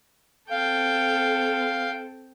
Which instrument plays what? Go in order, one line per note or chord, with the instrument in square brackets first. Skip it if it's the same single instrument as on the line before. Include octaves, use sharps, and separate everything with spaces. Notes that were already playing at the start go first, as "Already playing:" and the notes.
[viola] C4 A4 [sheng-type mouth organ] F5 [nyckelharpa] G5